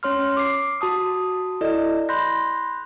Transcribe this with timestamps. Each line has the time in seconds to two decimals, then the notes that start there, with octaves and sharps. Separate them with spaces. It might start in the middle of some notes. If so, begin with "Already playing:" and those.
0.03 C#4 C#5 C6 F6
0.37 D6 C7
0.81 F#4 A5 D#6
1.61 E4 A4 D5 D#5
2.09 B5 C6 F#6 G6 A#6